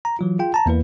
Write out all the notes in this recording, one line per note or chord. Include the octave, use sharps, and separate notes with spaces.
A#5
E3 F#3 F4
F4 G#4 G5
A5 A#5
E2 A#3 E4 B4